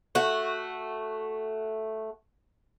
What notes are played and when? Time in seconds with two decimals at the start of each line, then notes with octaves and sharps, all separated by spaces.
0.15 A3 F#4